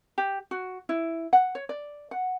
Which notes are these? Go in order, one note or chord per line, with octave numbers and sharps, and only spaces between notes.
G4
F#4
E4
F#5
C#5
D5
F#5